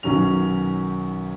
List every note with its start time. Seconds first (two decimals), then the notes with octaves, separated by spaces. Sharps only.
0.03 B1 D#3 F#3 C#4 F7